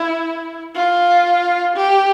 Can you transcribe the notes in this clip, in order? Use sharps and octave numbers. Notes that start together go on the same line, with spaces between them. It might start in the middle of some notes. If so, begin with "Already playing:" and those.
Already playing: E4
F4
G4